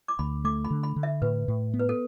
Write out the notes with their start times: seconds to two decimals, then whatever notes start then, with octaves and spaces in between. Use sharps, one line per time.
0.08 D6
0.19 D2 B5
0.44 A3 D6
0.65 B5
0.71 D3
0.83 B5
0.96 D3
1.03 E5
1.22 A2 B4
1.48 A2
1.74 B3
1.80 B4
1.89 A4